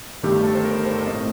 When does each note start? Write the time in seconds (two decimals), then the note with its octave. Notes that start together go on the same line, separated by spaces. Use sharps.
0.23 G1 G2 D#3 A3 G4
0.44 A4
0.55 C5
0.65 A#4
0.86 C5
1.07 A2 A3 C4 D#5